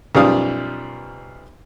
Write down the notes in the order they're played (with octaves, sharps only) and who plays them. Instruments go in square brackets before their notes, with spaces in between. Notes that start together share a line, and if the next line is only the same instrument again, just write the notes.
[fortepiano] B1 F#2 F3 G3 F5 D#6